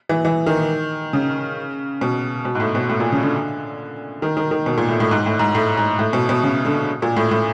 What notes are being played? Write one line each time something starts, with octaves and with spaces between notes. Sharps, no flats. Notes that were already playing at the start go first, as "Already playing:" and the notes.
E3
E3
D#3
C#3
B2
B2
G#2
A2
B2
A2
A#2
C#3
D3
D#3
D#3
D#3
B2
A#2
A2
A2
G#2
A2
G#2
A2
G#2
A2
B2
B2
C#3
D3
A#2
A2
A2